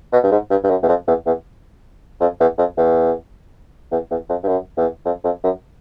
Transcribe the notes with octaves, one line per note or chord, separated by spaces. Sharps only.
B2
G2
G#2
G2
G2
F#2
E2
F2
E2
E2
F2
E2
F2
E2
E2
E2
F2
G2
F#2
E2
F2
F2
F#2